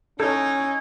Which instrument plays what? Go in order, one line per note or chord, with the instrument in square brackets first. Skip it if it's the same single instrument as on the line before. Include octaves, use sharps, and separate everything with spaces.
[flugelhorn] C#4 [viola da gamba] D#4 E4 [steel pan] A4 [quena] G#6